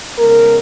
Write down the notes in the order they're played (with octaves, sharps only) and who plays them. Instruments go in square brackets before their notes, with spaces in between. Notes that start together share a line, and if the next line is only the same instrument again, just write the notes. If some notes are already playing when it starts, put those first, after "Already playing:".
[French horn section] C#3 G#3 B3 A#4